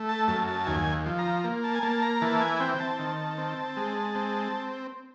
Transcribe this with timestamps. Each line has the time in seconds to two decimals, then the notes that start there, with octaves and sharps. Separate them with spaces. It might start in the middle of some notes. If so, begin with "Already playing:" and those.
Already playing: A3
0.09 A5
0.28 F#2 A5
0.47 A5
0.67 D#2 G#5
1.06 F3
1.19 A#5
1.44 A#3
1.64 A5
1.75 G#5
1.83 A#3 A5
2.02 A#5
2.22 E3 A5
2.41 G#5
2.60 C4 G5
2.80 A5
2.99 D#3
3.38 C4
3.77 G#3
4.15 C4